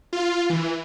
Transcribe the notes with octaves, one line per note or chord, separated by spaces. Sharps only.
F4
E3